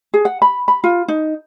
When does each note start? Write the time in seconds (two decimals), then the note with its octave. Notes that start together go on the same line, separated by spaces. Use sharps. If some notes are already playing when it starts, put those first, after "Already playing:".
0.14 G#4
0.25 F#5
0.42 B5
0.68 B5
0.84 F4
1.08 D#4